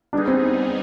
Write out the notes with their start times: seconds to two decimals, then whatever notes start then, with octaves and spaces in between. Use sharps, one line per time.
0.13 G3 B3 D4 D#4 G#4
0.28 C4